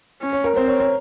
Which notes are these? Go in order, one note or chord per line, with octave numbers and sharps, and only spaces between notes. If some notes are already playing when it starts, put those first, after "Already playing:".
C#4
C#5
A#4
C4 C5
C#5
C#5